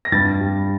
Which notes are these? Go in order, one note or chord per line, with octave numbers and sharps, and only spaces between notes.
A#6
G2 A6
G3